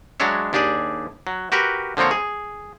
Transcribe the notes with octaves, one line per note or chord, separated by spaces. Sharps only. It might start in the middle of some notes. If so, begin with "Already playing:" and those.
F#3 G#3 D4 C#5 E5
D#2 D4 G4 G#4 D5
F#3
F#4 G4 A#4 B4
D3 F3 A#3 C4 C#5
G#4